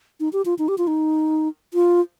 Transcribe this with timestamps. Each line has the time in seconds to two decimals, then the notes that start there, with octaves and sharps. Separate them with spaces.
0.20 D#4
0.33 G4
0.45 F4
0.59 D#4
0.68 G4
0.78 F4
0.87 D#4
1.74 F4